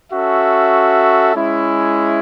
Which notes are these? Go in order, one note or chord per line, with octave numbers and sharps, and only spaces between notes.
C#4 F#4 A4 E5
G#3 C#4 E4